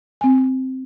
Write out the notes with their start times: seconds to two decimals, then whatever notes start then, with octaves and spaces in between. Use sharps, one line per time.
0.21 C4 G#5